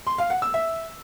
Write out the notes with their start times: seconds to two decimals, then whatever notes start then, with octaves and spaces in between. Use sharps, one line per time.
0.07 C6
0.18 F5
0.30 F#5
0.42 E6
0.54 E5